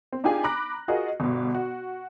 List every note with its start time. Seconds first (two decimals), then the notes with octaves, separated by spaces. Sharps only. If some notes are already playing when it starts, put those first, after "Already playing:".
0.13 C4
0.24 D4 D#4 F4 G4 G#4 G#5
0.44 A#5 B5 D6 F#6 A#6
0.88 F4 F#4 G#4 A#4 D#5
1.20 G1 B2
1.54 F#4